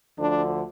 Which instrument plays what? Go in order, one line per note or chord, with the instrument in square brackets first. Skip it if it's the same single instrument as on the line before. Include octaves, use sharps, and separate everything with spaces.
[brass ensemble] D2 D3 F3 D4